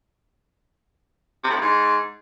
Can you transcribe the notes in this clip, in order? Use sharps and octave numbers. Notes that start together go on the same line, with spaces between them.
C3
A2
G2
G#2